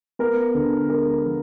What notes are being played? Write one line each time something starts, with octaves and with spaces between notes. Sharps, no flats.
B3 A#4
D3 A4
G#3 A#4
F3